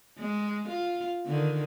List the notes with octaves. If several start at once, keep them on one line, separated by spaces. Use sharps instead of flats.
G#3
F4
D3 D#3